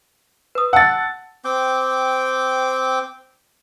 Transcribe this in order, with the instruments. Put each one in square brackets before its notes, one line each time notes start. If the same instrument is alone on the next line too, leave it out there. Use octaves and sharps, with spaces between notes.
[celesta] B4 D#6
[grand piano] F#5 A6 [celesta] A5 E6 F#6
[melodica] C4 G5 D6